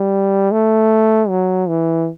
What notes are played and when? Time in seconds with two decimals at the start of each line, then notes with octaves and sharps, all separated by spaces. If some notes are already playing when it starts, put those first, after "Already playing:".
Already playing: G3
0.52 A3
1.29 F#3
1.68 E3